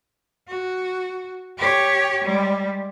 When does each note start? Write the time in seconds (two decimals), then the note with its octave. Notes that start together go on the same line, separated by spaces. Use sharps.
0.48 F#4
1.58 G4 C#5
2.24 G3 G#3